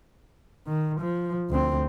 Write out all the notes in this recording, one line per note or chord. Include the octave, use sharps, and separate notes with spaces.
D#3
F3
D2 C4